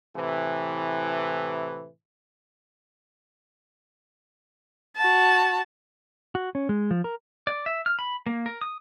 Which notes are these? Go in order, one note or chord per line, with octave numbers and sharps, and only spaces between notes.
A2 C3 E3
F#4 A5
F#4
C#4
G#3
F3
A#4
D5
E5
F6
B5
A#3
A#4
D#6